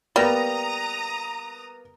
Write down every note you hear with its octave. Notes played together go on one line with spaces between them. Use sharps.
G3 A#3 B3 A#5 D#6 A#6